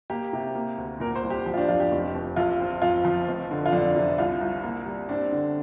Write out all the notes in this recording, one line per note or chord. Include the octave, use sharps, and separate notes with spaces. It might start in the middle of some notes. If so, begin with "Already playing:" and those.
A#3 G4
C3
A#3
D2
A#2 A#4
C5
C2
G4
F3
F4
D4
F2 F4
G4
F1
F1
A#1 F4
C4
F2 F4
F3
F1
D3
F4
F2 D4
C3
C2 F4
C2
A#3
G3
C4 D4
D3